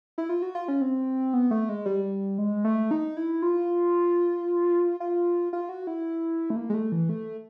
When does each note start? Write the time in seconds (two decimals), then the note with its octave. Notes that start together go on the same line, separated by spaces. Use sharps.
0.18 E4
0.29 F4
0.42 F#4
0.55 F4
0.68 C#4
0.81 C4
1.34 B3
1.51 A3
1.69 G#3
1.86 G3
2.38 G#3
2.64 A3
2.91 D#4
3.17 E4
3.42 F4
5.00 F4
5.53 F4
5.69 F#4
5.87 E4
6.50 A3
6.56 A#3
6.70 G#3
6.74 A3
6.92 E3
7.09 A3